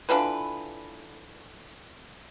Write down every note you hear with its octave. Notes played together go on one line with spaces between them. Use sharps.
D3 E3 F4 B4